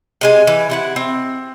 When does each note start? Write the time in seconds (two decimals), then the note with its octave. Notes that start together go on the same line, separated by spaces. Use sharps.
0.21 C3 G#3 G#5
0.47 E3
0.70 C3 E4 F#5
0.96 C4